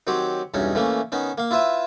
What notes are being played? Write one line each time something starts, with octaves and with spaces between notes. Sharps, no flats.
D#3 F#3 C4 G4 C#5
B1 E2 G2 C#4 D#4 C#5
E3 A3 A#3 C#4
D#3 B3 C#4 D#4
A#3 F5
E4 F4 B4 E5